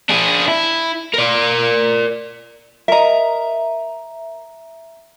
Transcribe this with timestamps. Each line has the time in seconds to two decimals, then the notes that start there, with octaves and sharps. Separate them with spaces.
0.10 D4 G#4
0.48 E4
1.14 A#4 D5
2.88 A#4 D#5 E5 A#5